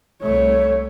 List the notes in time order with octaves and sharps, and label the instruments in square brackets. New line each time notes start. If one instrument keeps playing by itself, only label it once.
[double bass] C2 A3 [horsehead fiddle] C#5